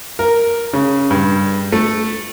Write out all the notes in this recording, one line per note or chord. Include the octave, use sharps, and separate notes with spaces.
A#4
C#3
G2
A3